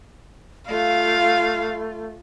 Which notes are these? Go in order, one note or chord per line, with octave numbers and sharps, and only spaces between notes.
A3 F4 F5